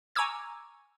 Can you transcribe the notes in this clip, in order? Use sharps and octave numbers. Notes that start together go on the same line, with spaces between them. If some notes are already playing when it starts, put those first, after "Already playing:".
G#5 A#5 C#6 D6 E6 G#6